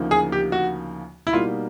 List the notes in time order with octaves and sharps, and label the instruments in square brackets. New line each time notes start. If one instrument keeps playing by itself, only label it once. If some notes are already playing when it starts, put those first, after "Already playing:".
Already playing: [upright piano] D2 C#3 F3 A#3 D#4
[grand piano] G#4
G4
F#4
E4
[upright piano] B2 G3 A#3 D#4 [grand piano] F4